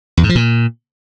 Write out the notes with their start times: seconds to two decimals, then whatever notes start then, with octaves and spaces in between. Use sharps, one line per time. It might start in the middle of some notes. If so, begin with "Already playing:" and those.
0.17 E2
0.23 G#2
0.29 F3
0.35 A#2